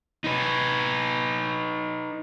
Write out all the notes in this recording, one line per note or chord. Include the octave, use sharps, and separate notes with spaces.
D#4 B4